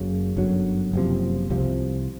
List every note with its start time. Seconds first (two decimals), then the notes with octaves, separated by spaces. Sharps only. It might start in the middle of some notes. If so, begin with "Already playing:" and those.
Already playing: F#1 F#2 C#3
0.36 G1 F#2 D3 F#3
0.93 F#1 E2 C3 F3
1.50 C2 C3 F3